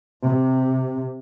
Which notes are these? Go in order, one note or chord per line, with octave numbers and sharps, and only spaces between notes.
C3